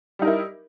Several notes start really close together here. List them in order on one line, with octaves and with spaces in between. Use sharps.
G3 D#4 A#4 E4